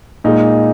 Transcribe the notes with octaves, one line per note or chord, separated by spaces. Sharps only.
A#2 G#3 D#4